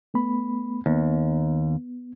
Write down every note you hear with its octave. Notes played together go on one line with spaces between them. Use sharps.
A3 B3 B5
D#2 B3